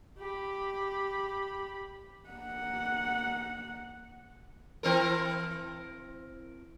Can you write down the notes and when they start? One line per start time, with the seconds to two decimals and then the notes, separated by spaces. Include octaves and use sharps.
0.19 G4 B5
2.29 A#3 F#5
4.83 E3 C4 A#4